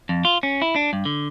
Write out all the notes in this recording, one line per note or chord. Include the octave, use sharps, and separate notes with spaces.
F2
F4
C#4
E4
D4
G2
D3